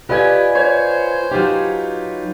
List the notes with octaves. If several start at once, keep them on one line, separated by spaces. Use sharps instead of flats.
F4 G4 B4 D5 D#5 G#5
C5 C#5
F#3 D#4 F4 G4